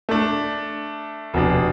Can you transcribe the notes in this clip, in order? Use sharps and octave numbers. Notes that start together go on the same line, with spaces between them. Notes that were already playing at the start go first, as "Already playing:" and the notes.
A3 D4
F1 B2 D4